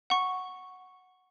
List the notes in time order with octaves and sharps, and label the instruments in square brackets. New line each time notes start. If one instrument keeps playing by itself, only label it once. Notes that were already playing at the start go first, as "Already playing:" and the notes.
[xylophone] F#5 C#6